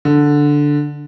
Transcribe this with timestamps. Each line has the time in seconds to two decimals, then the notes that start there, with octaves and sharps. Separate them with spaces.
0.05 D3